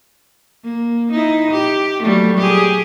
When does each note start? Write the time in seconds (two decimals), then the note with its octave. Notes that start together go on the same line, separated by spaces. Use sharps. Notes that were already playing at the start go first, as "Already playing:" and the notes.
0.64 A#3
1.12 D#4 E4
1.51 G4
2.03 F#3 G3 A3
2.38 G4 G#4